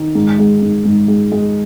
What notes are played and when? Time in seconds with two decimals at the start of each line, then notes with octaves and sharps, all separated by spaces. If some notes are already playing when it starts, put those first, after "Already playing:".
Already playing: D#3
0.15 G#2
0.39 G#3
0.62 G#2
0.85 G#2
1.08 G#3
1.32 G#3